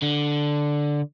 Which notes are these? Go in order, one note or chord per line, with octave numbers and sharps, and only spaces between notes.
D3